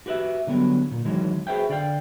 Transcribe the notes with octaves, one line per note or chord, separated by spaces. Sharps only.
F#4 G4 B4 D5 E5
D3 F#3 G3 B3
A#2
D#3 E3 F#3 G#3
F#4 G#4 B4 C5 E5 G5
D3 D5 F5 G5